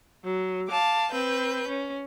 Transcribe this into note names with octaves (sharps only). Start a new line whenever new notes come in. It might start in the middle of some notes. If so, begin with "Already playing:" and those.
F#3
F5 A5 D6
C4 B4 G6
C#4